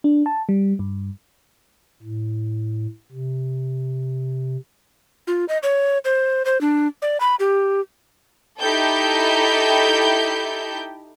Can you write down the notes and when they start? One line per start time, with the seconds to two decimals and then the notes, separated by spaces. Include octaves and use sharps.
0.04 D4
0.26 A5
0.49 G3
0.79 G2
2.03 A2
3.12 C3
5.27 F4
5.49 D#5
5.63 C#5
6.05 C5
6.45 C5
6.61 D4
7.02 D5
7.20 B5
7.40 G4
8.61 D#4 E4 G4 A4 G5 G6